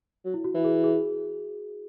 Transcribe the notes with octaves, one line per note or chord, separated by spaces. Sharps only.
F#3
E4
F#4
E3
G#4
G#4